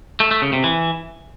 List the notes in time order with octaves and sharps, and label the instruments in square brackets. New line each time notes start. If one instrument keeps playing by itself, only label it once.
[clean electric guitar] A3
A3
C#3
C3
E3